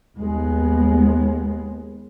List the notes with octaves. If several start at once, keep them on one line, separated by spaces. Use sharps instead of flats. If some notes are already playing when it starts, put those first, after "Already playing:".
D#2 G#3 B3